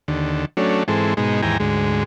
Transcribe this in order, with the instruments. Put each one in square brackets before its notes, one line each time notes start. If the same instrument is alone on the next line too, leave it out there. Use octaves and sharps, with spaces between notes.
[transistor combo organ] D#2 D3
F#3 A3 C#4 D4
G#2 E3 G#3 C4 A4
G#2 B2 G#3 D#4
D#2 G#2 E3 G5 G#5 A#5
D2 G#2 G#3